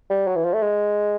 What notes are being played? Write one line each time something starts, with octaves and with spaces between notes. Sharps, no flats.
G3
F#3
E3
F3
A3
G#3